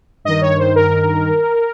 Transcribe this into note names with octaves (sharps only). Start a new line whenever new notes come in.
G2 D#3 D#5
C#5
C5
A#4